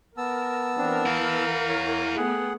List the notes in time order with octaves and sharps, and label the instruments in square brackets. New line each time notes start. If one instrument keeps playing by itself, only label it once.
[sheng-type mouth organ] B3 A5 E6 [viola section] A#4
[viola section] E3 A#4 [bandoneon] C4 D4
[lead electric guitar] E4 F#5 [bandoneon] F5 A#5
[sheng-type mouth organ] C#5
[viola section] A3 B3 [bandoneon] G#4 F#5 [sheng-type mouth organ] G5